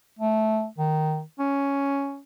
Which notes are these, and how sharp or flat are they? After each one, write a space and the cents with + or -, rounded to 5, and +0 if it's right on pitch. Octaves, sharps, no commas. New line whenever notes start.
A3 -10
D#3 -5
C#4 +5